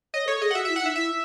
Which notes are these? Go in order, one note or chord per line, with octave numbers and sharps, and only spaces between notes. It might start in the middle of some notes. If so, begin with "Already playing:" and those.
C#5 D#5
A4 C#5
G#4 D#5
F#5
F#4 E5
E4 E5
F#5
D#4 E5
E4 E5